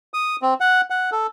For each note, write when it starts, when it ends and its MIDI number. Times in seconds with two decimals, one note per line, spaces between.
0.14 0.36 87
0.42 0.54 60
0.60 0.81 78
0.90 1.10 78
1.12 1.27 69